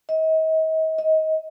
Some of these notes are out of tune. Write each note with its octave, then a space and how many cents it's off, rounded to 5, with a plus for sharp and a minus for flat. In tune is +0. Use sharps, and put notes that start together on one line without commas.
D#5 +40
D#5 +25